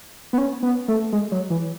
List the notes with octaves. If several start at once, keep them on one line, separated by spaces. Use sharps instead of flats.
B3
C#4
B3
A3
G#3
F#3
E3